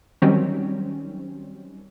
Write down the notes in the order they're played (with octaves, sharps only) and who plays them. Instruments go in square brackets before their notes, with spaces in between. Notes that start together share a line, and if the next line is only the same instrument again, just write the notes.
[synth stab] D#3 F#3 G3 C4 C#4